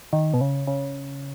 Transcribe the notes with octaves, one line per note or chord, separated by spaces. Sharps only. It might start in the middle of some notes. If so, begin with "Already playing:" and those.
D#3
B2
C#3
C#3